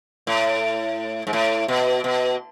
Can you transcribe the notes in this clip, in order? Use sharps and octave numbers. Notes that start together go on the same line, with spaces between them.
A2
G#2
A2
B2
B2